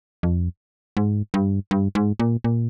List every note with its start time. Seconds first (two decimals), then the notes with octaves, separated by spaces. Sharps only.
0.23 F2
0.97 G#2
1.34 G2
1.71 G2
1.95 G#2
2.20 A#2
2.44 A#2